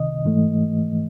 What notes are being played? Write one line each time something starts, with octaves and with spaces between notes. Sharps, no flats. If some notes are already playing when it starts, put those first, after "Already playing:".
Already playing: C2 C3 D#3 D#5
G#2 E3 A3